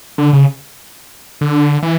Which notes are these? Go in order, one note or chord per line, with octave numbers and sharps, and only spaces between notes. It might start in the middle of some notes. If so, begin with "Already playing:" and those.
D3
C#3
D3
E3